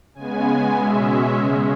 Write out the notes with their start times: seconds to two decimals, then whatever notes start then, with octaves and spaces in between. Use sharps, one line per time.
0.15 C#3 G#3 B3 G#5
0.45 G#5
0.74 B2 G#3 C#4 E5
1.34 C#3 G#3 C#4